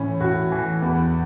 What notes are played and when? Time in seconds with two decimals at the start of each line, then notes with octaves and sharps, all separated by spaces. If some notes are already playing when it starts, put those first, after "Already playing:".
Already playing: A2 E3 C#4
0.20 A2 F#4
0.52 E3
0.82 E2